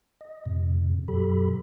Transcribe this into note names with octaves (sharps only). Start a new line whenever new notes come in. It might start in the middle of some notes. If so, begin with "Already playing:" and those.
D#5
F2 A2 C3
F#2 B2 F#3 G4 A4 B5